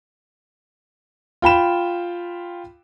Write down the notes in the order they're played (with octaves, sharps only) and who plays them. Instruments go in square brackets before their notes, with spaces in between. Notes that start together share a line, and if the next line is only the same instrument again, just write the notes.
[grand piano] F4 G5 B5 E7